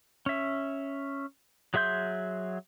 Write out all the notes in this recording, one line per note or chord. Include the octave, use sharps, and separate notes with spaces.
C#4 E5
F#3 G#4 E5 C6 G6